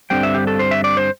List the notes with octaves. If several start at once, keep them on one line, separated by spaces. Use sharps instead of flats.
G2 D3 G3 C4 G5
E5
G4
A4
C5
E5
D5
C5